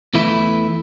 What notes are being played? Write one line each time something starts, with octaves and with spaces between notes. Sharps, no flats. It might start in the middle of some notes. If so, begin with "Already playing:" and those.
E2 E3 A3 E4